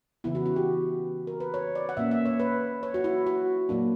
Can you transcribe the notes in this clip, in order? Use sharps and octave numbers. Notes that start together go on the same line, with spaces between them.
C#3 E3 B3 E4
F#4
F#4
G4
A#4
B4
C#5
D5
F#5
A#2 A#3 C#4 E5
E5
C#5
B4
C#5
F#4
E4
F#4
A#2 F#3 A#3 D4